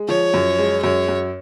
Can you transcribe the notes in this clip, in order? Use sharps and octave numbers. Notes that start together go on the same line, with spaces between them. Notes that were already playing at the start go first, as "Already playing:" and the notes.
Already playing: G#3
F3 C#5
F#2
G#3
F#2 C#5
F#2